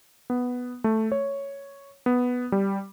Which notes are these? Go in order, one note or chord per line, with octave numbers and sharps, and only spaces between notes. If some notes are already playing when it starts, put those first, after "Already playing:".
B3
A3
C#5
B3
G3